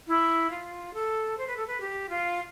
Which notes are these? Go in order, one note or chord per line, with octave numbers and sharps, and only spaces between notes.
E4
F4
A4
C5
B4
A4
B4
G4
F4